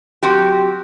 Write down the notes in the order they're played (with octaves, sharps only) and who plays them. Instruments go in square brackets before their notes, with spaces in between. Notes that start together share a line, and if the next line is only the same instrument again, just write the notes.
[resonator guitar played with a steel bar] F#3 C4 F#4 G4